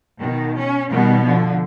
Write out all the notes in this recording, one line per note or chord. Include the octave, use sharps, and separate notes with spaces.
B2 D#3
C#4
B2 D#3 G3 B3
D3 F3